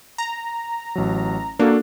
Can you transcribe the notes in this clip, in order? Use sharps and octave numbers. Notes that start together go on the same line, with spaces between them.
A#5
A1 F#3
A#3 D4 F#4 A4